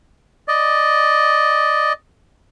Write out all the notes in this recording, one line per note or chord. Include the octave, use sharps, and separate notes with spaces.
D5 D#5